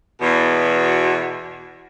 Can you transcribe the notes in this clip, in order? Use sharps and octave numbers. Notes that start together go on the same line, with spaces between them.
E2 B2